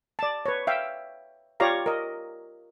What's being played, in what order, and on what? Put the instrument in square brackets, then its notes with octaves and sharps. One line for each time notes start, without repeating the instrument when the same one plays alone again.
[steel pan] D5 A5
B4 C#5
E5 F5 G5
F4 G4 C#5 D5 F5 A#5
A#4 D#5